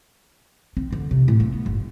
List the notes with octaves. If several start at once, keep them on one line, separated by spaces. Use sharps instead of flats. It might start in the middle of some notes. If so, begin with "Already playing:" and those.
C4
D3
C3
A2
A3
B3
G1